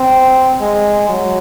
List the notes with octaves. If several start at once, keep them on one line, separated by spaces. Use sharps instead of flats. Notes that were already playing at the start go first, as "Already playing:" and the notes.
Already playing: C4
G#3
F#3